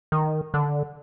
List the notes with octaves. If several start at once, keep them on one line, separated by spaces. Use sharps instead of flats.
D#3
D3